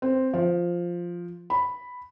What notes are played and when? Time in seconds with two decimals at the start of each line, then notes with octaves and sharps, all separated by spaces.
0.02 C4
0.34 F3
1.50 B5